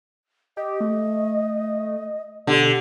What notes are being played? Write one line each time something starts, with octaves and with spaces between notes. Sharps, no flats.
G4 D#5
A3
B2 D3 G4